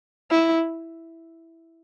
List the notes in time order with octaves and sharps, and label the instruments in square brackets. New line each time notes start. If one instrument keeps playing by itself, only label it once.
[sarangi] E4